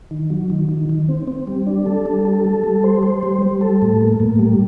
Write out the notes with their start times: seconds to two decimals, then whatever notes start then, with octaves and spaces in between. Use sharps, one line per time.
0.11 D#3
0.30 F#3
0.50 D#3
0.69 D#3
0.89 D#3
1.09 C4
1.28 C4
1.47 G3
1.67 D4
1.86 A4
2.06 G3
2.25 A4
2.44 A4
2.64 G3
2.84 C5
3.03 C5
3.23 G3
3.42 G3
3.61 A4
3.82 A2
4.01 A#3
4.20 A2
4.39 G3